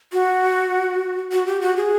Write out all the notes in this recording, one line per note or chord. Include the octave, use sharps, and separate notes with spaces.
F#4
F#4
G4
F#4
G#4